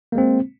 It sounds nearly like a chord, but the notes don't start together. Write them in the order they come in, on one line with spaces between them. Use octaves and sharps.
A#3 G#3 C4